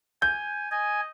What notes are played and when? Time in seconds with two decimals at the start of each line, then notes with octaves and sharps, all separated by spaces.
0.22 G#5 G6
0.71 D#5 G#5